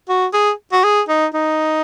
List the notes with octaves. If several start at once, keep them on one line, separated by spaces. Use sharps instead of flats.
F#4
G#4
F#4
G#4
D#4
D#4